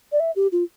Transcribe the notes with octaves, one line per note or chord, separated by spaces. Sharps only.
D5
E5
G4
F4